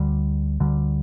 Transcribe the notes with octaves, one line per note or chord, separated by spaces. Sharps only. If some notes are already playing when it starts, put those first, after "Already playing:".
Already playing: D2 D3 G3
D2 D3 G3